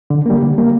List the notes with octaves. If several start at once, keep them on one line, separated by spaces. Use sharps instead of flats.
D3
G3 A#3
D3
G3 A#3